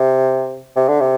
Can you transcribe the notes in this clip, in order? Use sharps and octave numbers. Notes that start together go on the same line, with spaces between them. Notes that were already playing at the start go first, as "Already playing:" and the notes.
Already playing: C3
C3
D3
C3